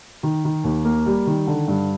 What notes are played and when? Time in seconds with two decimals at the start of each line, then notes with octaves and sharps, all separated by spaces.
0.23 D#3
0.45 D#3
0.64 D#2
0.85 A#3
1.06 G3
1.27 D#3
1.47 D3
1.68 G2